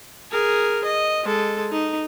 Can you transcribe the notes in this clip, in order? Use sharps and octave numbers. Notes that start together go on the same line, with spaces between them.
G#4 A#4
D#5
G#3 A4
D#4